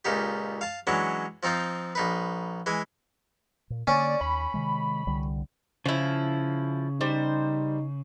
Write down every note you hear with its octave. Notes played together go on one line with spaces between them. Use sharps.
C#2 A#2 D#4 G4
F5 A5
E3 F#3 G#3 C#4 D4
F3 C4 D#4 F4 C5
A#1 D#4 B4
E3 G#3 G#5
A#2
D3 A#3 C#4 D5
D#2 B5
C3 D#3 G#3
C2 D3 G3
C#3 F3 E4
G3 D#4 C5